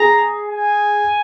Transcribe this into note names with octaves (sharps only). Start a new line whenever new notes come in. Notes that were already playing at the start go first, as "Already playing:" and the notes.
Already playing: G#4 A#5
G#5